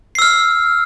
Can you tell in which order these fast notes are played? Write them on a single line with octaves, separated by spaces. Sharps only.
C7 E6 F6